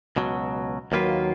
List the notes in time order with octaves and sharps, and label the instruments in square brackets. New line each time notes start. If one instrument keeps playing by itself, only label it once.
[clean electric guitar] C#2 B2 F#3
[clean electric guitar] D#2 D#3 A#3 F4 B4 [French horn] F#3